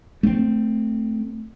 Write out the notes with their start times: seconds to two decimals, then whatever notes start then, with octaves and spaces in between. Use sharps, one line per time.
0.23 A3 A#3 C4